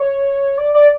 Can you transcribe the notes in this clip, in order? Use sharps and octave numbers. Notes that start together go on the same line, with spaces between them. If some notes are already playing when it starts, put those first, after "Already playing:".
Already playing: C#5
D5
D5